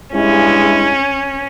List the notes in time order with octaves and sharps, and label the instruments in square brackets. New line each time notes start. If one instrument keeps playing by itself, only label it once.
[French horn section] G2 G#3 E4 [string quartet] C#4